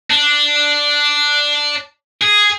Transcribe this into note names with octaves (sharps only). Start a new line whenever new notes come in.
D4
G#4